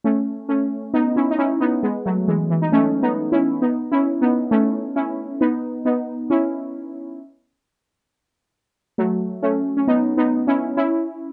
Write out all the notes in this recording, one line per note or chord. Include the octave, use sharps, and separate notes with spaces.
A3 C#4
A3 C#4
B3 D#4
C#4 E4
D#4
C#4 E4
B3 D#4
G#3 B3
F#3 A3
E3 G#3
E3
D#4
A3 C#4
B3 D#4
C#4 E4
B3 D#4
C#4 E4
B3 D#4
A3 C#4
C#4 E4
B3 D#4
B3 D#4
C#4 E4
F#3 A3
A3 C#4
C#4
B3 D#4
B3 D#4
C#4 E4
C#4 E4